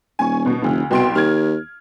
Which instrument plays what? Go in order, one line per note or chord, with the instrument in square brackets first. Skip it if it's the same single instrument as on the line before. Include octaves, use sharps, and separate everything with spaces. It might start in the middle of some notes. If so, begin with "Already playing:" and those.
[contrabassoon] D#1 [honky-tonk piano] G#5 C#6
[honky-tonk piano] B2
[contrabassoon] F1 [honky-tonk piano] D2 D3
[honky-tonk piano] C2 C6 D7 [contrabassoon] B2
[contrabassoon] D#2 [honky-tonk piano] F6 G#6